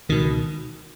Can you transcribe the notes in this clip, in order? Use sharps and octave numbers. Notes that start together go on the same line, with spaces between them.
C#2 B2 D#3